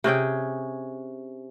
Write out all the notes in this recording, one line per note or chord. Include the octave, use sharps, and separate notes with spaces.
C3 C#4 G#4 G5